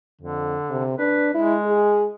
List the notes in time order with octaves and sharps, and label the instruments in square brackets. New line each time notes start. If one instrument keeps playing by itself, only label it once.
[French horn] F2 [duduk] D3
[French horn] C3
[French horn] D4 [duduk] B4
[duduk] G#3 [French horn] E4
[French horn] G#4